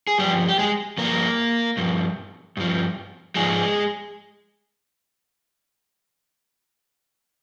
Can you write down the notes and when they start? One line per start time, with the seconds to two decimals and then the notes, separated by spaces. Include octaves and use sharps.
0.07 G#4
0.19 G2 F3 G3 G4
0.49 G4
0.58 G#3 G#4
0.98 G2 F3 A#3 A#4
1.77 G2 F3
2.57 G2 F3
3.35 G#2 F3 G#3 G#4